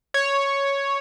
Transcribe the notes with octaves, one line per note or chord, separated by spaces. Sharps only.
C#5